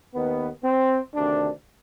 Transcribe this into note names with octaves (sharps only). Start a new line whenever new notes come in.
D#2 D#3 B3
C4
D2 C3 D#3 D4